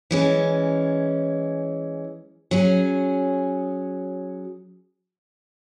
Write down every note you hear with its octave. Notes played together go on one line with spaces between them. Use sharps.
E3 G#3 C#4
F#3 C#4 G#4